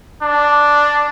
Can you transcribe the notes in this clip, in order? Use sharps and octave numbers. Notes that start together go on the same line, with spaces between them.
D4